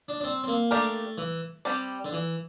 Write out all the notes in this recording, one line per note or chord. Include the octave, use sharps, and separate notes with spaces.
D4
D4
C4
C4
A#3
A3 A#3 D4 G4 A#4 D5
E3
G3 C4 G4 D5
D3
E3